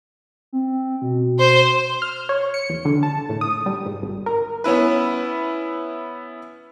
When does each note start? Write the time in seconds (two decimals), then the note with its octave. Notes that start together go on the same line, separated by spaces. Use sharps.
0.53 C4
1.02 B2
1.39 C5
2.02 F6
2.29 C#5
2.54 C#7
2.70 E2
2.85 D3
3.03 A5
3.29 A2
3.41 D#6
3.66 G3
3.86 G#2
4.03 G#1
4.26 A#4
4.64 B3 C#4 E4 B4